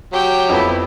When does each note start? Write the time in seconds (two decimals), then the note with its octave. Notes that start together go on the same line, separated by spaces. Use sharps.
0.13 F#3 G4 G5
0.49 F2 B3 E4